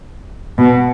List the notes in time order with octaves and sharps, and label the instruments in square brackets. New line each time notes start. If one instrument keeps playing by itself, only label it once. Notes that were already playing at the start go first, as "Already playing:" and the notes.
[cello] B2